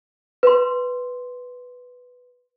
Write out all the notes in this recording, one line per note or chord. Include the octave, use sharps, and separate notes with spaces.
B4 C6